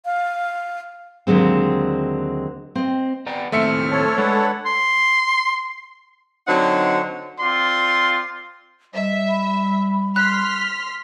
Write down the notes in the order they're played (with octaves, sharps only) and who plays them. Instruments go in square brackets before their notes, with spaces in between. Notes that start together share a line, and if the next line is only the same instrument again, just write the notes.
[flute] F5
[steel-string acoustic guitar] D#2 D3 F#3 G#3 C4
C4 D#5
[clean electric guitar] B3 D5 A#5 [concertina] G5
[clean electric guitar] D#2 A2 C4 [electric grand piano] A3 E5 C#7 [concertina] C5 F6
[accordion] A4 C#5
[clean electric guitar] G#3 [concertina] D4 B4 F#5
[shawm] C6
[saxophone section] D3 F#3 C4 D#4 F#5
[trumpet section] C4 F4 D5 C6
[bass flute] G3 [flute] D#5 [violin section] E5
[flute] B5
[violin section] C6 F6 B6 [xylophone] F#6